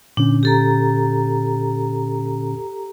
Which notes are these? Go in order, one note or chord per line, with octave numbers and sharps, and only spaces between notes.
A#2 D3 C#4 D4
G4 A4 A#5